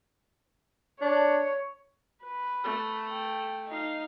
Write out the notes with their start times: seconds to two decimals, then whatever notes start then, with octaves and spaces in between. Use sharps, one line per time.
1.01 D4 C#5
2.24 B4
2.64 A3
3.10 G5
3.67 D#4 F5